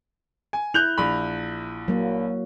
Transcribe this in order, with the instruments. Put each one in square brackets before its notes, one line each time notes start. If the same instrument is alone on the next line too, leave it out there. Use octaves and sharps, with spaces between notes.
[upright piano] G#5
[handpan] E4 [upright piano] F#6 G6 F7
[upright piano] A#1 B5
[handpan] F#3 A#3